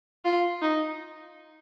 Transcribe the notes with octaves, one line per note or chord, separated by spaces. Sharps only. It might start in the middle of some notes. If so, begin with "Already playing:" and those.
F4
D#4